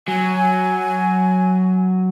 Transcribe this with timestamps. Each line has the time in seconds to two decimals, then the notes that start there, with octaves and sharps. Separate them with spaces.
0.08 F#3 G#5